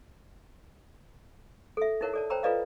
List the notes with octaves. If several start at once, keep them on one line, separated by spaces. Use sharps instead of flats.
A4 E5
D#4 E4 A#4 C#5 F#5
A4 D5 A5
C5 C#5 G5 A#5 B5 E6
F4 A4 B4 D5 D#5 F5